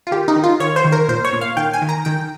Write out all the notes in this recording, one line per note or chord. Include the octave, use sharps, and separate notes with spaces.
F4
D#3 G4
D#4
D#3
F4
D#3 C#5
C5
D#3
A#4
A#2 C5
C#5
A#2
F5
D#3 G5
G#5
D#3
A#5
D#3 G5